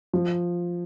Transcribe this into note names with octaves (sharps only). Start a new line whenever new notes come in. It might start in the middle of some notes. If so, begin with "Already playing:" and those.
F3